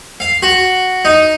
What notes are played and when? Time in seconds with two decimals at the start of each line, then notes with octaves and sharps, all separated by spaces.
0.20 F5
0.43 F#4
1.05 D#4